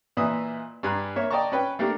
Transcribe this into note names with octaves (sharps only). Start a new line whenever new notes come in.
A#2 E3 D#5 E5 D#6
G2 D4 G#5 A#5 B5 F#6
A#3 C#5 E5
D5 D#5 G5 A5 A#5 C#6
C#4 B4 G5
A3 A#3 D4 G4 A4 A#4